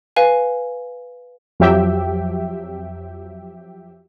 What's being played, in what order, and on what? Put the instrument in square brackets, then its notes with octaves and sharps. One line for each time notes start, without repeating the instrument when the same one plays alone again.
[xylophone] B4 F5 G#5
[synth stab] F2 F3 F#3 G4 E5 G5